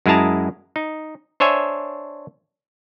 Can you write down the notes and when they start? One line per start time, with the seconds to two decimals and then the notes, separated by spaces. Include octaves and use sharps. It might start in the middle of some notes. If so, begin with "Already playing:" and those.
0.06 F#2 G#3 E4 G#4 A5 A#5
0.76 D#4
1.40 D4 C5 C#5 E5 G#5